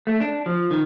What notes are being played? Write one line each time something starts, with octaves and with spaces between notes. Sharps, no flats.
A3
D4
F3
D#3